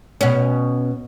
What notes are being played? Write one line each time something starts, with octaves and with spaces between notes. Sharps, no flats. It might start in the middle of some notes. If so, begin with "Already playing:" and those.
B2 C#4